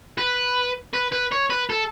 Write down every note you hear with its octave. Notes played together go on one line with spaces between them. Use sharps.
B4
B4
B4
C#5
B4
A4